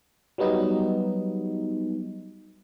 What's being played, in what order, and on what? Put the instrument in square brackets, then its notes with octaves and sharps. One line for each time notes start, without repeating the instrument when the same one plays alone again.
[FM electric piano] F#3 G3 B3 D#4